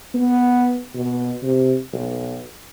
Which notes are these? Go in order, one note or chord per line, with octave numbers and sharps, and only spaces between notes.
B3
B2
C3
B1